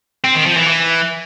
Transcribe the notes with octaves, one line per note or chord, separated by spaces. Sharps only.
C4
D#3
F3
E3
E3